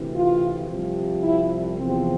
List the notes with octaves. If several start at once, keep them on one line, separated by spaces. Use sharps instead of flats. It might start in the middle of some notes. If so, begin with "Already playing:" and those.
Already playing: D2 C3 E3
F4
C2 C3 F3
E4
E2 C3 F3 C4